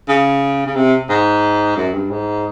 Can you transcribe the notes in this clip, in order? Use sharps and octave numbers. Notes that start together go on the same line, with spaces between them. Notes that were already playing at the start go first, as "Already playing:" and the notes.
C#3
C#3
C3
G#2
F#2
G2
G#2